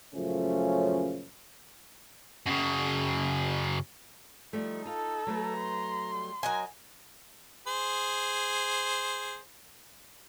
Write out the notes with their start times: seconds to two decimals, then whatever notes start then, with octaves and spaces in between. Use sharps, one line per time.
0.14 F#2 A#2 C#3 F3 A3 C#4
2.47 F#2 C#3
4.53 F3 G3 A3 D#4
4.85 F4 A4 F5
5.27 F#3 A3 B4 A#5
5.59 C6
6.13 G3
6.43 F#3 A#4 D#5 G#5
7.67 G#4 C5